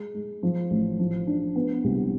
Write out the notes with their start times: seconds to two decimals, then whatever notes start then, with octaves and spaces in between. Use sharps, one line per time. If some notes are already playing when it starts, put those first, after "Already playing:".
Already playing: G#3
0.14 G#3
0.43 F3
0.71 A1
0.99 F3
1.27 D4
1.56 B3
1.84 C2